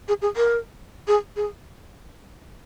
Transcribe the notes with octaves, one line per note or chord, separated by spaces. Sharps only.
G#4
G#4
A#4
G#4
G#4